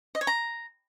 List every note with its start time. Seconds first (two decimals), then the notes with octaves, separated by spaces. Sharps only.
0.15 D#5
0.21 C#5
0.27 A#5